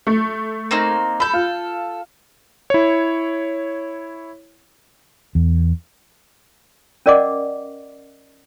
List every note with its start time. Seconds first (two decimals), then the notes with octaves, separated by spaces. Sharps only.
0.07 A3
0.71 A#3 C4 D#4
1.20 A4 B5 G6
1.33 F4
2.70 E4 C#5
5.35 E2
7.06 C#4 A#4 D5 D#5 F#5 D6